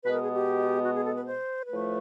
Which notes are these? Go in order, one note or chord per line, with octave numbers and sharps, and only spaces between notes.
B2 G#3 B3 B4
A#4
G#4
G4
F#4
G#4
A4
B4
C5
A2 F3 A3 B4